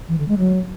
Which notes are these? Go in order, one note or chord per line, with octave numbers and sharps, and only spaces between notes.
E3
D3
G#3
F#3